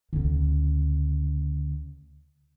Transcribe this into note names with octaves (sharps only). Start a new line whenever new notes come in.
D2 C#3